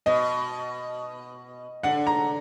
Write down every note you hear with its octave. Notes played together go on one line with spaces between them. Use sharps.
B2 D#5
D3 F#5
A#5